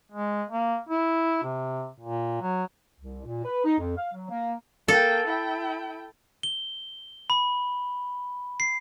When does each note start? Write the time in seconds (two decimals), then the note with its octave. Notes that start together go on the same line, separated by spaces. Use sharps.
0.12 G#3
0.49 A#3
0.89 E4
1.44 C3
2.00 A#2
2.41 F#3
2.99 C2
3.25 A#2
3.44 B4
3.65 D#4
3.78 F2
3.97 F5
4.13 F#3
4.30 A#3
4.88 A#3 A4 G5
5.27 E4 G5
6.43 G7
7.30 B5
8.60 C7